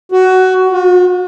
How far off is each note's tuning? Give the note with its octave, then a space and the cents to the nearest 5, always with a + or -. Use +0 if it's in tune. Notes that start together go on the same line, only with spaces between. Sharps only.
F#4 +15
F#4 -45